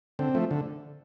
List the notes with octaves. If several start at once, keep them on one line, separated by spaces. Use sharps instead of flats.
D3 C4
F3 A3
D3